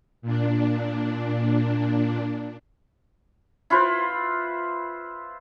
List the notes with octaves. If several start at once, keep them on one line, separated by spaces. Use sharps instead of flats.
A#2 D4
E4 F4 B4 C5